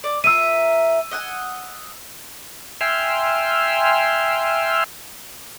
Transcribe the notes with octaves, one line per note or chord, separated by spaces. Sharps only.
D5
F4 A#4 E5 E6 D#7
D#5 F#5 G#5
E5 G5 G#5 C6 E6 F6